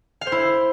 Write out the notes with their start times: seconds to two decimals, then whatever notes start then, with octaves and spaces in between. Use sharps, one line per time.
0.21 F5
0.27 C5
0.32 E4